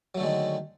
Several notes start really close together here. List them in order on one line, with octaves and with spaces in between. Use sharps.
F#3 A3 D3 G#3 D#3